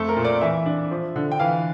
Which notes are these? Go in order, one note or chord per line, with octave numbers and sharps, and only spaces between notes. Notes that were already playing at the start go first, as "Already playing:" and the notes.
Already playing: F2 A3 A4
A#4
A#2
D5
E3 E5
D4
F3
D3
G5
E3 F5